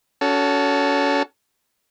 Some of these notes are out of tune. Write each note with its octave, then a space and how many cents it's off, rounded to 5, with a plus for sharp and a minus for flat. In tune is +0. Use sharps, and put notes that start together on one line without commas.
C#4 +30 F#4 +0 A4 +0